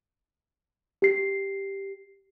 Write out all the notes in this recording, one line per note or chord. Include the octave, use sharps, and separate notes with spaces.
G4 C7